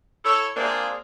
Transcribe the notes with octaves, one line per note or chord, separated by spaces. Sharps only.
E4 A4 C#5
G#3 A#3 C4 D4 F4 G#4